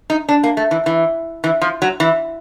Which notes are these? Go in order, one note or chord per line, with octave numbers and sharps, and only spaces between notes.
D#4
D4
A#3
A3
E3
E3
E3
F3
F#3
E3